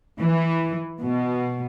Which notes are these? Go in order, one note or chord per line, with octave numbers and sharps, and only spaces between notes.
E3
B2